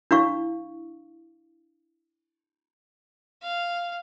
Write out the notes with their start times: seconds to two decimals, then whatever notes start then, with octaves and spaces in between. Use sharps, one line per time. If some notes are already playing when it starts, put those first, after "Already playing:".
0.11 D4 E4 F5 C#6
3.42 F5